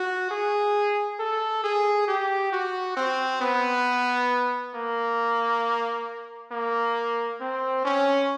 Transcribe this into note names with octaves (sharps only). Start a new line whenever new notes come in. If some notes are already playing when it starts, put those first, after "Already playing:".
Already playing: F#4
G#4
A4
G#4
G4
F#4
C4
B3
A#3
A#3
C4
C#4